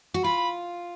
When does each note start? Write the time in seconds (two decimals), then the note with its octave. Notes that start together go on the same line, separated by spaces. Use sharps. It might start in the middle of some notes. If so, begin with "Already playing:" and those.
0.14 F#4
0.24 F4 B5